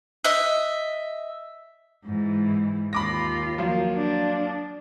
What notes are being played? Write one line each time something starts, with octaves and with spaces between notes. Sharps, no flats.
D#5 E5
G#2 E3
D#2 F4 B5 D6 A#6
F3 F#3 A#3
D4